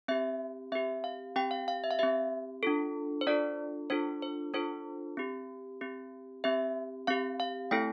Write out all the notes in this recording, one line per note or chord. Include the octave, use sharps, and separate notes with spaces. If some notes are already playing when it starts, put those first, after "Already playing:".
C4 G4 E5
C4 G4 E5
F5
C4 G4 G5
F5
F5
E5
F5
C4 G4 E5
D4 F4 A4
C5
D4 F4 A4 D5
D4 F4 A4 C5
C5
D4 F4 A4 C5
C4 G4
C4 G4
C4 G4 E5
C4 G4 F5
F5
A3 C4 E4 A4 G5